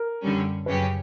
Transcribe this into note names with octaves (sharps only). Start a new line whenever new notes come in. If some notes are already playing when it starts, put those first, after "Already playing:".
Already playing: A#4
F#2 D3 G3 C#4
F#2 C#3 F#3 C#4 G4 B4